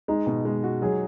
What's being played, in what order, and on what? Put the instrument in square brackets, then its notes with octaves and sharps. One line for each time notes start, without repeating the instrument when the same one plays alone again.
[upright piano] G#3 [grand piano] D#4
[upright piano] B2
G#3
F#4
[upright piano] F#3 [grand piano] G#4